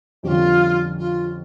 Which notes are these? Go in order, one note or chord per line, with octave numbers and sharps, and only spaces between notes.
F2 D3 G3 C#4 F4 G4
F4